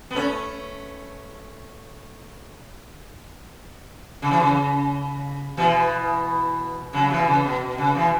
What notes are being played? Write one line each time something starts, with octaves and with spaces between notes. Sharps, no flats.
B3
A3 C#4
C#3
E3
C#3
B2 E3
C#3 F#3
B2 E3
C#3
B2
B2
C#3
B2 E3